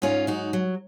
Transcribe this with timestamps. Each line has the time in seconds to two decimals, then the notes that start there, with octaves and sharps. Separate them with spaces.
0.02 G#2 C#4 F4
0.27 F#3 D#4 F#4
0.53 F#3